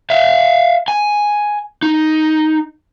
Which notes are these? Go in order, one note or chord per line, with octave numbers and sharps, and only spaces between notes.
E5 F5
G#5
D#4